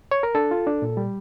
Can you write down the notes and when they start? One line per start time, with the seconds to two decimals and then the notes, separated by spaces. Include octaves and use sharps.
0.11 C#5
0.23 A#4
0.35 D4 A4
0.51 F4
0.67 D4
0.82 A#2
0.97 G3